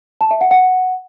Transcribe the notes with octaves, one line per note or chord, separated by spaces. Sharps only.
A5
E5
F#5
F#5